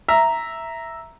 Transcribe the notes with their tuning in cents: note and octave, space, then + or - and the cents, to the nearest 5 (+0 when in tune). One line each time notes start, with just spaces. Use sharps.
E5 +0 A#5 +0